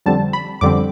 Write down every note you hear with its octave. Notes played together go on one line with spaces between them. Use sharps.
F2 D3 G3 C4 A5
B5
F2 D3 G3 C4 D6